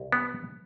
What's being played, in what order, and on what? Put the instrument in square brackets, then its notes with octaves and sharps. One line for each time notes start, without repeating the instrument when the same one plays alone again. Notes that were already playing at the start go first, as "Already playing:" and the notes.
Already playing: [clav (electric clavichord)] C2
B3